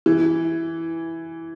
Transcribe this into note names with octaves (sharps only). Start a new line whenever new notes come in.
E3